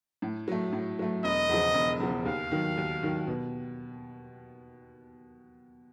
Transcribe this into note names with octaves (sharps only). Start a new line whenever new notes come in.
A2
F#3 A3
A2
F#3 A3
E1 D#5
E2 C#3 F3
E1
E2 C#3 F3
D#2 F5
D#3 F#3
D#2
D#3 F#3
B2